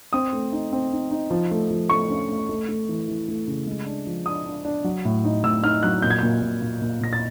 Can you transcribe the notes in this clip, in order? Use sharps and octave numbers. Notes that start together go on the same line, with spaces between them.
C4 D#6
A3
D#4
C4
D#4
D#4
F3
A3
F3
A3 C#6
C#4
A3
A3
A3
E3
E3
A3
C#3
G#3
D4
F3
D4 D#6
D4
D4
F#3
A2
D#4
A2 E6
D#4 F6
F#3 F#6
A#2 G6
G#6
A#2 G6
A#2
A#2
A#2
A#2 A#6
A6